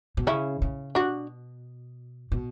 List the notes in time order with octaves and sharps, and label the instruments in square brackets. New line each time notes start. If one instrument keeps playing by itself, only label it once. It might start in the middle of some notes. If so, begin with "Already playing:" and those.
[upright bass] B2
[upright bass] C#3 [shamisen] C#4 E4
[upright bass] C#3
[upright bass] B2 [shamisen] D4 F#4
[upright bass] B2